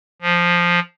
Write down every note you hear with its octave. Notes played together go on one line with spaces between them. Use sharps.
F3